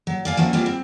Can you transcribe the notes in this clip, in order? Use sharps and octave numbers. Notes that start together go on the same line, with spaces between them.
F#3
D5 F5 G#5
F3 F#3 A#3 C#4 E4
G3 G#3 B3 C4 F4 G4
C4